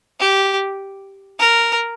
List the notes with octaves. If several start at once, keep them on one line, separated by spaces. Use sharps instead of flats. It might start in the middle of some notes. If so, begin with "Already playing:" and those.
G4
A#4